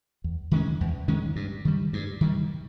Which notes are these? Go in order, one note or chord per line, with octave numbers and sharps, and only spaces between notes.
E2
D#3 G#3 C#4
E2
D#3 G#3 C#4
G2
D#3 G3
G2
D#3 G3